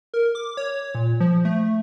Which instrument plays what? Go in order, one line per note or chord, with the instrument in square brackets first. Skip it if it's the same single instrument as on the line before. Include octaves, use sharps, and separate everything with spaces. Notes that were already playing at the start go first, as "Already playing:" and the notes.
[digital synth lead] A#4
D6
C#5
A#2
F3
A3